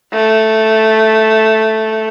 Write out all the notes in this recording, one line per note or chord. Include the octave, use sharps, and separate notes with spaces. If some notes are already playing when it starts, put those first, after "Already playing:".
A3